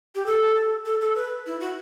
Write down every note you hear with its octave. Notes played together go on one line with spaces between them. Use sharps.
G4
A4
A4
A4
B4
E4
F#4